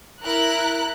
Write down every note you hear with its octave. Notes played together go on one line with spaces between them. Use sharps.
E4 A#4 F#6